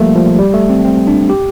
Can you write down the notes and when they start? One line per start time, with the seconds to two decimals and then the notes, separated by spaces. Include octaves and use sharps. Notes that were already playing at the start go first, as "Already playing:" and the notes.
Already playing: F3 G3 A3 A#3
0.16 F3
0.39 G3
0.54 A3
0.69 C4
0.85 C4
1.07 D4
1.30 G4